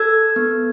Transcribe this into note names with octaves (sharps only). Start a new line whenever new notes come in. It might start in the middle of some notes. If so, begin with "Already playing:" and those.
Already playing: A4 E6 G#6
B3